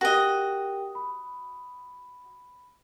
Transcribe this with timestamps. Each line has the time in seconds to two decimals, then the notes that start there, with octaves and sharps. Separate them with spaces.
0.01 F#4 G4 A#4 D#5 G5
0.95 B5